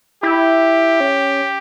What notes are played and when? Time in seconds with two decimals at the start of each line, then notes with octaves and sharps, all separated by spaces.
0.23 E4 G4
1.00 C#4